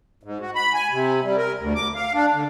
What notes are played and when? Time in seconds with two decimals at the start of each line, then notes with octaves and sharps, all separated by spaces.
0.23 G#2
0.41 F#4
0.55 B5
0.74 G#5
0.91 C3
1.24 G3
1.37 A#4
1.60 D2
1.75 D6
1.95 F5
2.14 D4
2.34 D3